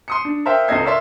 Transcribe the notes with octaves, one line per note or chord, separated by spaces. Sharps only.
C6 D#6 C#7
D4
A#4 C5 E5 F5 G5
C#2 C4 A4 D#5 G#6 C7
A#4 C#5 D5 E5 C6